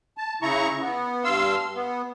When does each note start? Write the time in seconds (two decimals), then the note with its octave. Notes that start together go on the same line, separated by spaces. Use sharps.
0.17 A5
0.42 C#3 E4 A#5 C#6
0.81 B3
1.24 G2 F5 C6 E6
1.76 B3